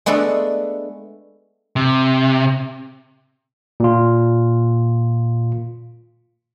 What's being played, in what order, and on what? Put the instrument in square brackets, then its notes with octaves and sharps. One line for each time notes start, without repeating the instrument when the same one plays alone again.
[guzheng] G#3 A3 B3 D4 A4
[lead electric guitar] C3
[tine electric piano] A#2 F4